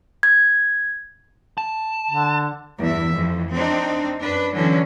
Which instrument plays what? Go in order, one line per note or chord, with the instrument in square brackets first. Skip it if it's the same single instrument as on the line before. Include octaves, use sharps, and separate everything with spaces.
[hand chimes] G#6
[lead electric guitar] A5
[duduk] D3
[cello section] E2 G2 E5
F2 E3
C4 D4 D#4
F#2 D4 B4
D3 E3 F#3 C#4